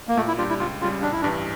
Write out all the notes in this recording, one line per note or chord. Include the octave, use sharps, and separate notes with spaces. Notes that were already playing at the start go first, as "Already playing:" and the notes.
A#3
A#2 A3
E4
G3 D4 F4 G4
E4
C#2 F4
C#3 G3 F4
A1 D4
E4
D4
G2 E3